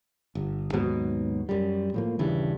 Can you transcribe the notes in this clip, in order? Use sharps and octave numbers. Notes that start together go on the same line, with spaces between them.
G1
D#2 G#2 B2 F#3
F#2 G3
A2 F3 A#3
D#1 G2 C#3 E3